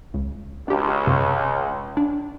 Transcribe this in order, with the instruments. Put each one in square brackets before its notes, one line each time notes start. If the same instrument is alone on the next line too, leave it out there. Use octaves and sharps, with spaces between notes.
[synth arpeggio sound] C#2
[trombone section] C#2 [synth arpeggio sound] D4 G4
[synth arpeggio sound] F#2 C3
D4